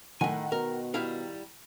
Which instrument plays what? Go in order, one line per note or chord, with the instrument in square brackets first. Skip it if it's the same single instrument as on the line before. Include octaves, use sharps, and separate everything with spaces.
[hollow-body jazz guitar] A2 G#5 [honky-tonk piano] D#3 F#5
[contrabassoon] B2 [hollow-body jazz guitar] A#4
[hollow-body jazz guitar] G3 E4 F5